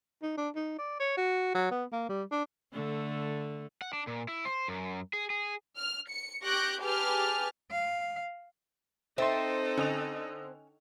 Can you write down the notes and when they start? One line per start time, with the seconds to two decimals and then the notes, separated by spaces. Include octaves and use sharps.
0.23 D#4
0.37 D4
0.56 D#4
0.78 D5
1.00 C#5
1.17 F#4
1.55 F#3
1.71 B3
1.93 A#3
2.09 G3
2.32 D4
2.73 D3 A3
3.82 F#5
3.93 D4
4.07 A#2
4.28 E4
4.45 C5
4.68 F#2
5.13 G#4
5.30 G#4
5.78 F6
6.09 C#7
6.44 G4 C#6 F#6 G6 A#6 D7
6.82 G4 G#4 B4 G#5 A5 F6
7.71 F5
9.18 C4 D#4 A4 E5 C6 A6 E7
9.77 D3 C#4 D#5 F7